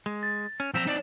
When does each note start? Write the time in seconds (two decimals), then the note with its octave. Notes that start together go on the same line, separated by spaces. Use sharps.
0.06 G#3
0.23 A6
0.60 C#4
0.74 F3 C4 A#5 E6 B6 E7
0.86 D#4 D5 E7